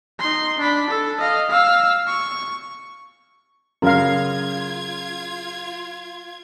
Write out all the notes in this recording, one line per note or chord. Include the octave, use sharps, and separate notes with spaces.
D#4 C6
D4 B5
A4
D#5 F5
F5 E6
C#6
F#2 C#3 C#4 F4 F#4 A#4 F5 G#6